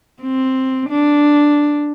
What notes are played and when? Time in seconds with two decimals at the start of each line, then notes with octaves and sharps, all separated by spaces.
0.22 C4
0.89 D4